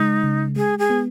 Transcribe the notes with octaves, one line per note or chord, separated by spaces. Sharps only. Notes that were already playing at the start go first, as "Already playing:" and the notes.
Already playing: C#3 G#3 D#4
C#3
G#3 G#4
G#4
B3